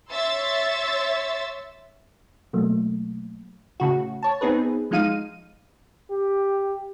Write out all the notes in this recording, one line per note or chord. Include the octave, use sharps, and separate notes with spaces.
C#5 E5 C6 E6 A6
B2 F#3 A3 A#3
A2 C#3 F#4
C#5 A5
B3 C4 D#4 G#4 B4
F3 G#3 D#4 F5 D#7
G4